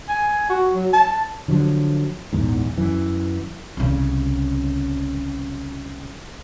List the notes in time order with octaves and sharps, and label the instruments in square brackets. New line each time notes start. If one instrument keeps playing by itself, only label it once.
[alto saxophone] G#5
F#4
F#3
A5
[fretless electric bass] D3 F3 F#3
A#1 E2 G#2
F#2 E3
[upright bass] C2 C#3